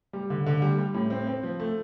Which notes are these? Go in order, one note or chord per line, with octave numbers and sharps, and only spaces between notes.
G3
D3
D3
G3
G3
A2
C4
C4
F3
A3